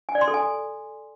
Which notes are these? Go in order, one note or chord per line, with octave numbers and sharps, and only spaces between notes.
G#5
D5
C6
A4
G#5